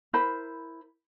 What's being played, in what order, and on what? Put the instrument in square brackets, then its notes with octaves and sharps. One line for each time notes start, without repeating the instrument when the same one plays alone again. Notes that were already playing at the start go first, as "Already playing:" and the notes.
[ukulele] E4 A#4 C5 B5